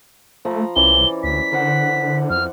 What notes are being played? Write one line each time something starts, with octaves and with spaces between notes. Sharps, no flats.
F3 A3 A#5 B5
C2 E3 C#4 D5 G7
D2 B6
D3 A#4 C5 F#5
F2 F6